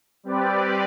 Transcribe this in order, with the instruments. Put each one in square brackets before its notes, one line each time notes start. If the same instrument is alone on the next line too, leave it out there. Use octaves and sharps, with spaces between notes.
[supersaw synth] G3 C4 G4 B4 D5